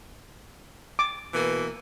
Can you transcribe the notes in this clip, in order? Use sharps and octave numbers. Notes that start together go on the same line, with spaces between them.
D6
B2 E3 A#3